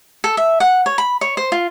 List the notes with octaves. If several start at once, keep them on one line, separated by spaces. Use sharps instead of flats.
A4
E5
F#5
C#5
B5
C#5
C5
F4